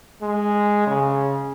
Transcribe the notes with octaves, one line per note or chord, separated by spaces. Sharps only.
G#3
C#3